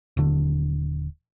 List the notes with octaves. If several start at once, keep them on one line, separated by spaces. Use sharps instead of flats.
D#1 D3